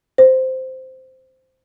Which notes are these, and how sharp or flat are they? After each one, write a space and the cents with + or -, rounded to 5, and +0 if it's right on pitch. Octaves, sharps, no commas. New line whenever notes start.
C5 -10